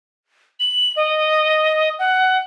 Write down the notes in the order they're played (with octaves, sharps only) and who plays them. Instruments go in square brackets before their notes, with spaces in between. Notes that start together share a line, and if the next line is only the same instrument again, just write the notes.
[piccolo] F#7
D#5
F#5